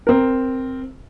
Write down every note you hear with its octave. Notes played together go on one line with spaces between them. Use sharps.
C4 A#4